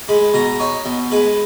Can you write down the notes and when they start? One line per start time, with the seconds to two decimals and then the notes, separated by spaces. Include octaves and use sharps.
0.09 G#3 B5
0.34 B2 A#5
0.60 D#4 C#5
0.85 B2
1.11 G#3 B4